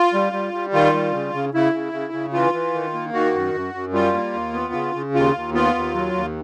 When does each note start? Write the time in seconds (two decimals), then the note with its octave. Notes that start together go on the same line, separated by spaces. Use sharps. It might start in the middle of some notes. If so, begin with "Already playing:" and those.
Already playing: F4
0.14 G3
0.33 G3
0.53 G3
0.73 D#3 F4
0.94 G3
1.13 C#3
1.33 C#3
1.54 C#3 E4
1.73 C#3
1.93 C#3
2.13 C#3
2.33 E3 F4
2.53 E3
2.74 D#3
2.93 A#3
3.13 D#3 F#4
3.34 F#2
3.54 F#2
3.74 F#2
3.93 G3 F4
4.13 A#3
4.34 D#2
4.53 B3
4.73 C#3
4.94 C#3
5.14 D#2 F4
5.35 D#2
5.54 B3 F4
5.75 D#2
5.95 F#3
6.14 D#2